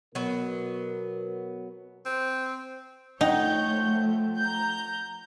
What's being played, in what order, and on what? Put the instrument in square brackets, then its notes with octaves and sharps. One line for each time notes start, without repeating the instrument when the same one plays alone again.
[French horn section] B2 A#4 [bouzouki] F#3 B3
[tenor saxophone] C4
[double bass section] F3 A3 [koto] D#4 [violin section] C#5 G6 [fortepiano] F#5 G5
[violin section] A#5 G6